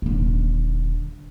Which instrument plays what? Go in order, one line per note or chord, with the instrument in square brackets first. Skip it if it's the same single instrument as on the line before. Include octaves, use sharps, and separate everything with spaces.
[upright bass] D#1 D3